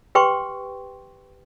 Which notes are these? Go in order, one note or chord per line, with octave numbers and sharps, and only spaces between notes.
G4 B4 G5 C6 C#6